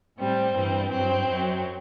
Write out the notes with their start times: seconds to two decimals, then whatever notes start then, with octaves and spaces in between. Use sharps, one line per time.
0.18 A2 G3 C4
0.54 G2 E3 G3
0.90 G2 F#3 C4
1.27 F#2 F#3